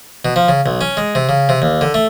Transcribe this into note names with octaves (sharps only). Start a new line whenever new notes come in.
B2
F3
C#3
B1
C#4
G#3
C3
C#3
C3
D#2
D3
A3